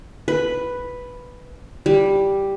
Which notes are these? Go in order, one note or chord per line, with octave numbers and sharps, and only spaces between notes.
B4
G3